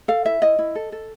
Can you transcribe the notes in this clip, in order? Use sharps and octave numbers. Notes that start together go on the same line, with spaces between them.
A4 F5
E4 E5
E4 D#5
E4
A4
A4